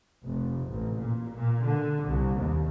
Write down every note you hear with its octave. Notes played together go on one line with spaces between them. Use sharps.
F1
A1
A#2
A#2
D3
C2
D#2